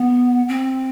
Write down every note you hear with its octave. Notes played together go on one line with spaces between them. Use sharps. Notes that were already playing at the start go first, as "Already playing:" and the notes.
Already playing: B3
C4